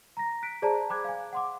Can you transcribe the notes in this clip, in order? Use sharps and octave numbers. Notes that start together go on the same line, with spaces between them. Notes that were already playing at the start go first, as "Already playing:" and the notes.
A#5 A#6
F#6 B6 D7
G#4 C5 D5 A5 A#5
G5 B5 D6 F#6 G#6
F5 G#5
F#5 C6 D6